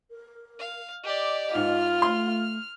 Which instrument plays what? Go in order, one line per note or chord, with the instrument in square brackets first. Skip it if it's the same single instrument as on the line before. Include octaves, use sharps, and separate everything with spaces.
[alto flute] A#4
[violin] F5
[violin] G4 D5 [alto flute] D#5
[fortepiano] G#2 [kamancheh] F4 [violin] F6
[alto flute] A3 [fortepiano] C6